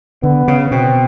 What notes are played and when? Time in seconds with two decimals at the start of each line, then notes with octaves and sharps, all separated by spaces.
0.23 D3 B3
0.48 C#3
0.71 B2 C4